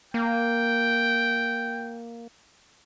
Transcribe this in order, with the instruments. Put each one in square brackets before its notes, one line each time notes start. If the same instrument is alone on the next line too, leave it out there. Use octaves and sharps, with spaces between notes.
[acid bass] A#3 [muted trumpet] G5